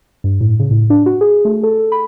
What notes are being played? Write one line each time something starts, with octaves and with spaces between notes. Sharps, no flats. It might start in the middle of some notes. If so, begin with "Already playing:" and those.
G2
A2
C#3
A2
D4
F#4
G#4
A3
A4
B5